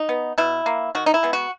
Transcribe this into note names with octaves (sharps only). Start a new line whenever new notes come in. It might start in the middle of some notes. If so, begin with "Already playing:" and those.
Already playing: D#4
B3
B2 E4
A#3
D#3 F#4
D#4
E4
G#3 B3
F#4